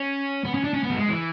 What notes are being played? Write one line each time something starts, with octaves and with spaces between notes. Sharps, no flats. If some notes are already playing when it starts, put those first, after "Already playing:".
Already playing: C#4
B3
C#4
D4
C#4
B3
F#3
G#3
E3